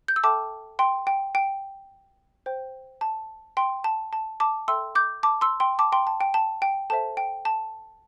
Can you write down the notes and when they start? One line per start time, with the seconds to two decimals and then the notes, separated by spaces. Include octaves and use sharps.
0.08 G6
0.16 E6
0.24 A4 E5 G5 A5 D6
0.79 G5 C6
1.07 G5
1.35 G5
2.46 C5 G5
3.01 A5
3.57 G5 C6
3.84 A5
4.13 A5
4.40 A5 D6
4.68 A4 E5 G5 C6 E6
4.95 D6 G6
5.23 A5 D6
5.41 C6 E6
5.60 G5 C6
5.79 A5 D6
5.92 G5 C6
6.07 A5
6.21 G5
6.34 A5
6.62 G5
6.90 A4 C5 E5 A5
7.17 G5
7.45 A5